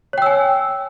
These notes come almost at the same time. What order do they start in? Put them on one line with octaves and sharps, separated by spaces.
C#5 G5 E6 G#5